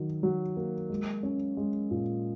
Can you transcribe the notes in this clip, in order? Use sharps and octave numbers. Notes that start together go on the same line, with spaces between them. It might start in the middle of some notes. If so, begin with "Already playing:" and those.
Already playing: D#3 F#3
F#3
A#3
G#3
C#4
G#3
A#2